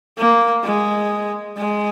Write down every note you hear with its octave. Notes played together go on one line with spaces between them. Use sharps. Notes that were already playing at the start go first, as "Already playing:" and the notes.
A#3
G#3
G#3